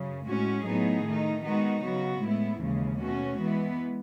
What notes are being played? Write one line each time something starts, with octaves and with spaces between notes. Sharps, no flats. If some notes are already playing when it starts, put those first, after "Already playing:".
Already playing: F#2 C#3
A2 G#3 C#4 F#4
A2 F#3 B3 D#4 G#4
D#3 A3 D#4
D#3 G#3 B3 D#4 F#4
C#3 F#3 B3 F#4
A2 G#3 B3 E4
D#2 C#3 E3 G#3
B2 A3 C#4 F#4
E3 G#3 B3